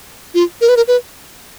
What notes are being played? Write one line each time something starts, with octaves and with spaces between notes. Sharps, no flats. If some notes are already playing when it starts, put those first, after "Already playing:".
F4
A#4
B4
A#4
B4